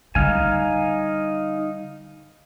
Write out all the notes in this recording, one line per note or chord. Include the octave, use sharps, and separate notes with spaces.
D3 G3 D#4 F5 G#5